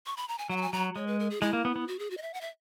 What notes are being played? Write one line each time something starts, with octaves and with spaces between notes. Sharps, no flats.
C#6
B5
A#5
G#5
F#3 F#5
A#5
G#5
F#3 A#5
G#3 C#5
B4
A#4
G#4
G#3 E4
A#3
B3
B3
F#4
G#4
F#4
D#5
E5
F#5
E5